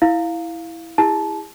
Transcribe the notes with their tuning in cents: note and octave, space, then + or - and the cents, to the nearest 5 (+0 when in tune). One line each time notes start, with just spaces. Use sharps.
E4 +0 F5 +0
E4 +0 G#4 -45 A5 -25